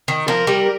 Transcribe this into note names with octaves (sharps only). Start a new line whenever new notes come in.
D#3
F3 A#4
G3